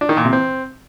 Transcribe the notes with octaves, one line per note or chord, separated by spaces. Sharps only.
D4
D#3
A#2
C3
C4